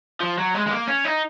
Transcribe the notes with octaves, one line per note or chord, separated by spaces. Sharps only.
F3
F#3
G#3
G#3
A#3
C#4
D#4